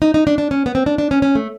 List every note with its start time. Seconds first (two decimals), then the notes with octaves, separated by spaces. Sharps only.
0.02 D#4
0.14 D#4
0.27 D4
0.38 D4
0.51 C#4
0.66 B3
0.75 C4
0.86 D4
0.98 D4
1.11 C#4
1.22 C#4
1.35 A3